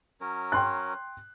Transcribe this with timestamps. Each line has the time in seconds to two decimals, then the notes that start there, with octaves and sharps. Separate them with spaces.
0.21 F#3 C#4 A#4
0.52 G5 C6 F#6